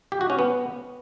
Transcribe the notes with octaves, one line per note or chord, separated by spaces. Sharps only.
G4
F#4
C#4
B3